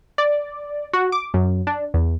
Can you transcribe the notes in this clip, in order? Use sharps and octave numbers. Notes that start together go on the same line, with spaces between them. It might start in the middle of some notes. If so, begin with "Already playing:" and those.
D5
F#4
D6
F#2
D4
E2